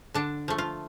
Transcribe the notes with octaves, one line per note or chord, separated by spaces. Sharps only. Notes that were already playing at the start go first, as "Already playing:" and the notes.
D3 D4
F3 A3
F4